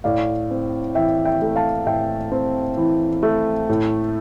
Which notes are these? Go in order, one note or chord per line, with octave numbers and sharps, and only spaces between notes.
A2 D5 F5
C4
E3 E5 G5
E5 G5
A3
F5 A5
A2 E5 G5
C4
E3
A3
A2